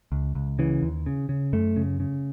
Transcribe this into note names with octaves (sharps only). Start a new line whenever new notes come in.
C#2
C#2
C#3 E3
D#2
C#3
C#3
F#2 A3
C#3
C#3